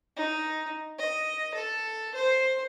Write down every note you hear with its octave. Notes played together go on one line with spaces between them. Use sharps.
D#4
D#5
A4
C5